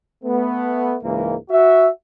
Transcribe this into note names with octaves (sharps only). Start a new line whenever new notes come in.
A3 B3
C#2 G#2 E3 A#3
F#4 E5